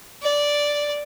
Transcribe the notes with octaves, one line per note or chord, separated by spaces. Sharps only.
D5